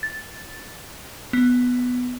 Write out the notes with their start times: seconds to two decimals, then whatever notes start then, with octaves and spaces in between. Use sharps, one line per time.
0.03 A6
1.33 B3